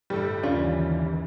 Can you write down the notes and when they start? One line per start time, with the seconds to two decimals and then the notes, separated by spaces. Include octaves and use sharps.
0.10 G1 A2 G3 A4
0.43 G1 D#2 C#3 E3 C#4 D4 F4